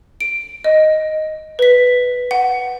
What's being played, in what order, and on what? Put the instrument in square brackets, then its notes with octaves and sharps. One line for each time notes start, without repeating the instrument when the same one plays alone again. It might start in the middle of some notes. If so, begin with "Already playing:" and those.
[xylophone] D7
D#5
B4 B6
F#5